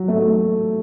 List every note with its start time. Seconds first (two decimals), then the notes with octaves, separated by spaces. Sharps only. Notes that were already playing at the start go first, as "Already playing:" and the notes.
Already playing: F#3
0.08 A3